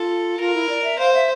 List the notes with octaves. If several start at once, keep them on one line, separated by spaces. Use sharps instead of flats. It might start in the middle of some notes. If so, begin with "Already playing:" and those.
Already playing: F4 A4
F4 A#4
E4
D5
E5
C5 F5
E5